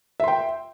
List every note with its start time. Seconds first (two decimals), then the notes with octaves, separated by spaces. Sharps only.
0.20 E5
0.24 C6
0.28 G5